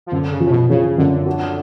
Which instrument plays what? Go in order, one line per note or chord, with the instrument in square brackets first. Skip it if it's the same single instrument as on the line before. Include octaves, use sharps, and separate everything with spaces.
[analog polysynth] F3
[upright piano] F#2 [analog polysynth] D3
[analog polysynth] C#3
[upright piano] F3
[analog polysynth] A2
B2
[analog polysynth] C#3 [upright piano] F3
[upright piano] F#2 [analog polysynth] D3
[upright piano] F#4